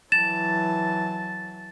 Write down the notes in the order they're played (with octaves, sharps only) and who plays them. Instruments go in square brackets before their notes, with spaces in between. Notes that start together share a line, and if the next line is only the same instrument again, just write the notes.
[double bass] E3 F#3 [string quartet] A5 [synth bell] A6 [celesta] E7